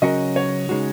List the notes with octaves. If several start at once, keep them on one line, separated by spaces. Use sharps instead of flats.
C#3 F#3 C#4 F#4 A#4 D#5
C#5
C#3 G#3 D#4 F#4